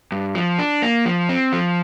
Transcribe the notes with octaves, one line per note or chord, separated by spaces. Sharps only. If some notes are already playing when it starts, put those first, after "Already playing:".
G2
F3
D4
A#3
F3
C4
F3